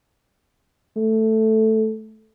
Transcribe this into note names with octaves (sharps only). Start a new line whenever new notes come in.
A3